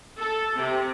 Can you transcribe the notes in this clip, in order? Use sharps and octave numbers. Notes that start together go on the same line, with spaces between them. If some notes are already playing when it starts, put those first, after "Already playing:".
A4
C3